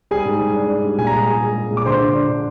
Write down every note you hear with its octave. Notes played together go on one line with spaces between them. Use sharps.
G3 G#4 G#5
G#2
G#2
D4
D4
G3
A#2 G#5
A#5
G#3 G#4 G#5
G#3
G#3
G#3
A#2
D6
D3 C5 C6
D3
D4
D3